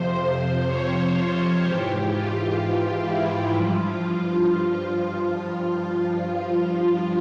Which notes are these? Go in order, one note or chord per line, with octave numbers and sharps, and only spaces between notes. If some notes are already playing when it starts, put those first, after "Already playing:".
Already playing: F2 C3 F3 C5
C#5
F4
G#2 E3 G4
F4
E4
G2 F3 F4
F4